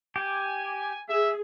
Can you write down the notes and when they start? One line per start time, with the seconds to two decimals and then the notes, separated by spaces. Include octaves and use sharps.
0.16 G4 G#5
1.08 G#4 E5